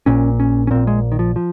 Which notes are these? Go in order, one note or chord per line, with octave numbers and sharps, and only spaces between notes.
A#1 A#2 C#4
C#4
C#4
A#1 A#2 C4
G#3
D#3
F3
F3